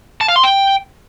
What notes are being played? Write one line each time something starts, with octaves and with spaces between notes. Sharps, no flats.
A5
F5
C6
G5